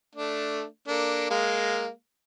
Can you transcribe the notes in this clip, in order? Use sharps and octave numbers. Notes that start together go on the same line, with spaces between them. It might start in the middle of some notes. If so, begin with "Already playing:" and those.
A3 D4
A#3 D4 A4
G#3 A#3 F5